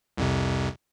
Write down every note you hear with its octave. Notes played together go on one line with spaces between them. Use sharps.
C2 F2 C3